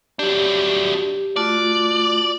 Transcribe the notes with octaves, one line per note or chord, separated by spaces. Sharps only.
F#3 D4 G4
A3 F4 F#4 D5